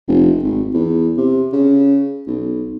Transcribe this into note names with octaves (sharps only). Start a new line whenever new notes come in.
F1
G#1
E2
C3
C#3
B1